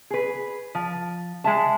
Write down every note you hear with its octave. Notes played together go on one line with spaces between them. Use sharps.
G#4 B4
F3
G#3 E5 A5